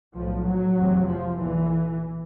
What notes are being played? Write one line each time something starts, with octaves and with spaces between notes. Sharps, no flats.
B1 A2 F3
F#3
F1 E2 C3
F3
B1 A#2 E3